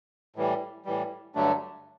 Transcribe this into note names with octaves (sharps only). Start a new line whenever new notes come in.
A2 E3 G3
A2 E3 G3
G2 D3 F#3 A3 D4